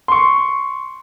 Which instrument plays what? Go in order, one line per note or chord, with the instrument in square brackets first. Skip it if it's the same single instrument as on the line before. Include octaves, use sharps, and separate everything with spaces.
[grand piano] C6 C#6